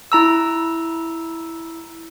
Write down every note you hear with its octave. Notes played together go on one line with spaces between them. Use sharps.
E4 A#5 E6